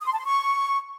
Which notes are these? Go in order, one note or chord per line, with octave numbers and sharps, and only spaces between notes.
D#6
C6
A5
C6
C#6